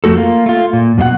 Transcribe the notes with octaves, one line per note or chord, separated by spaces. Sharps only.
F2 F3 A3 F#4 A4
A#3 F4
A3 F4
A#2
F#2 B2 F4 F#5